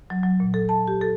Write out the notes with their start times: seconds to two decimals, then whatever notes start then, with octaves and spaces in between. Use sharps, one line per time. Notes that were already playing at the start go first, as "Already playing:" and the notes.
0.10 F#3
0.23 F#3
0.40 A#2
0.54 A4
0.69 A5
0.88 G4
1.01 A4